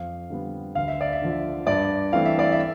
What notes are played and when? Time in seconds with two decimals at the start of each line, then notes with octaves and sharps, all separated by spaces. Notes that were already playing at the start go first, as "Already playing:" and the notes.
Already playing: F2 F5
0.30 D3 G3 B3
0.75 D2 F5
0.88 E5
1.01 D5
1.13 E5
1.22 D3 F3
1.67 G2 D5
2.13 E3 A3 C4 F5
2.26 E5
2.39 D5
2.52 E5